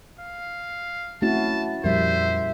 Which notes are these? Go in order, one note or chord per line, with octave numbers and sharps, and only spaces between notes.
F5
A3 C4 C#4 E4 F#4 A5
F2 A#2 F3 G3 A#4 C5 E5